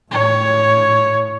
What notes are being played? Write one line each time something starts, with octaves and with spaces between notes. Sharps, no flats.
A2 C#5